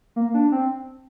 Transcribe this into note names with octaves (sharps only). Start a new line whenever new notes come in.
A#3
D4
C4